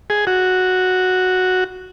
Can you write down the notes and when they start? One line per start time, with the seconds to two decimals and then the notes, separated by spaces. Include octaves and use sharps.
0.10 G#4
0.27 F#4